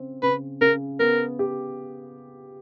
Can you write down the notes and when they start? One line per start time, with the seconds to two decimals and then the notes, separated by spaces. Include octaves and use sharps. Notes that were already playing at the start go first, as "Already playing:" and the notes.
Already playing: C#3 C4
0.23 C#3 B4
0.61 C#3 A#4
0.99 B3 A#4
1.39 G4